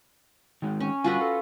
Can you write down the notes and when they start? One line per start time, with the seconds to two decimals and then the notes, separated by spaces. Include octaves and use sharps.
0.62 D#3 G#3
0.80 C#4
1.04 D3 G3 F4 F#4 B4 G#5
1.21 A4